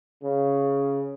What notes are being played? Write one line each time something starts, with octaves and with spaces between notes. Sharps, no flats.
C#3